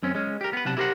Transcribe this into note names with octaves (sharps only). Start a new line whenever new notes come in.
F#2 C4 C#4
G#3 C#4
G4 A#4
B3 B4
B1 C3 F#5 A5
E4 G4 A#4 C5 F#5